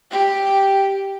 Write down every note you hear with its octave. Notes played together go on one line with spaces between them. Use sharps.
G4